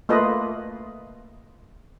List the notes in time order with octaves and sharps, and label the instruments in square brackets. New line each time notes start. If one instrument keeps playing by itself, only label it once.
[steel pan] A3 A#3 F4 B4 D#5